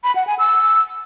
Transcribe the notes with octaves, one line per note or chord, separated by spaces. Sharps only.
B5
F#5
G#5
E6